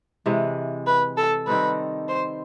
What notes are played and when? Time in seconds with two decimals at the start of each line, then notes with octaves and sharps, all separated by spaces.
0.26 C3 E3 G#3
0.87 B4
1.17 A4
1.47 D#3 G3 C4 D#4 B4
2.09 C5